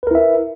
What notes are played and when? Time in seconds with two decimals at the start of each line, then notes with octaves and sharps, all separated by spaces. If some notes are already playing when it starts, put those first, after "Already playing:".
0.03 B4
0.07 A#4
0.11 E4
0.15 E5